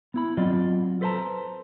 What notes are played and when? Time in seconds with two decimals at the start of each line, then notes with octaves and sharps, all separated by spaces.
0.14 B3 E4 B5
0.37 F#3 C4 F4 D5 D#5
1.01 A4 B4 C5 D#5 A5 A#5